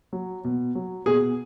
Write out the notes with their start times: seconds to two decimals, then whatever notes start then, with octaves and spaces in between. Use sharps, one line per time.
0.13 F#3
0.44 B2
0.75 F#3
1.06 B2 G#4